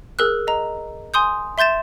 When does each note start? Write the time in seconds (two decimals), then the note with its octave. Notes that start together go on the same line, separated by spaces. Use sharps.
0.19 G#4 A#4 E6 F#6
0.47 D#5 A#5
1.14 G#5 C6 D#6 G6
1.58 E5 C6 G6 A6 E7